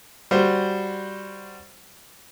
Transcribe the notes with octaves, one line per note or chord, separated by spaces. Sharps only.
G3 F#4 C5